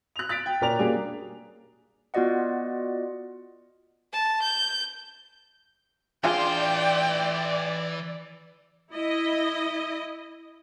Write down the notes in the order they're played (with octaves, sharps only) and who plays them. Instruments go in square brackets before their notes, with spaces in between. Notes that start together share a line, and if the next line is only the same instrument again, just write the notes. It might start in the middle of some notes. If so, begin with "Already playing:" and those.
[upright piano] F#6 F7
F#6 A6 B6 D7
G5
A#2 C#4 A#4 D5 G5 F7
B2 G3 A#3 D4 G#4
[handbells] B3 F4 F#4 D5 D#5 F#5
[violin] A5
G6
[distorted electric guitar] E3 C6 [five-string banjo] D4 F4 G#4 [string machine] D5 [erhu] G5
[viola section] E4 D#5